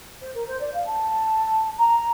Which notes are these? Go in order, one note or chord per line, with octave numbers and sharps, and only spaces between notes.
C5
A#4
C5
D5
F5
A5
A#5